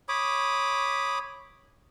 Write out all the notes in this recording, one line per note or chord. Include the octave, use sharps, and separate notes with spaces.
C#5 B5 D6 D#6